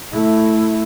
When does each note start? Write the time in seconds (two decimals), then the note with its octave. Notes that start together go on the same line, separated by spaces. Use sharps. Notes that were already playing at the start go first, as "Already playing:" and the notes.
0.12 A3 E4